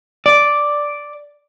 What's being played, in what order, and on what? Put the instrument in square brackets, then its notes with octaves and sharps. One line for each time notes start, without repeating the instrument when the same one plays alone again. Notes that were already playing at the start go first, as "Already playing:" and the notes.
[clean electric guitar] D5